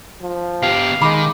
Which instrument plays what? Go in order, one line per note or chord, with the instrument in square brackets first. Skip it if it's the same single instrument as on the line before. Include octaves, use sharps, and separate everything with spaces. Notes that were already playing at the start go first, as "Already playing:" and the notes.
[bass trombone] F3
[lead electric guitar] B3 G4 [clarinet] F5
[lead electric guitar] D#3 [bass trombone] G#3 [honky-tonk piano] B5 D6